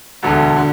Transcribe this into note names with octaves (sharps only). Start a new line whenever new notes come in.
E1 D2 D3 F#4 A4
D3